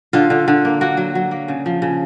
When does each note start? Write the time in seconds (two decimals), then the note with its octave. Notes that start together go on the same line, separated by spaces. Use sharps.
0.13 D3 F4
0.30 D3
0.48 D3
0.65 A#3
0.81 A#3 F#4
0.97 F#3
1.15 F#3
1.31 A#3
1.48 C#3
1.66 F3
1.82 C#3